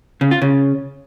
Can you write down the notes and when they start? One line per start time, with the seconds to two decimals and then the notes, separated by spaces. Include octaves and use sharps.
0.21 C#3
0.31 F4
0.42 C#3